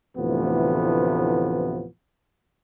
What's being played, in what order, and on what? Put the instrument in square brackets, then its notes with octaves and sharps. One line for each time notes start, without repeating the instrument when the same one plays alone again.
[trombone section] D2 A2 C3 E3 F3 B3